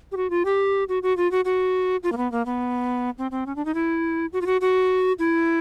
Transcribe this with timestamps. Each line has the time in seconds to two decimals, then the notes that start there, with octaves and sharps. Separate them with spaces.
0.12 G4
0.17 F#4
0.30 F4
0.45 G4
0.89 F#4
1.03 F#4
1.17 F4
1.31 F#4
1.45 F#4
2.03 F4
2.12 A#3
2.17 B3
2.32 A#3
2.46 B3
3.18 C4
3.31 C4
3.46 C#4
3.56 D4
3.65 D#4
3.75 E4
4.33 F#4
4.41 F4
4.46 F#4
4.61 F#4
5.19 E4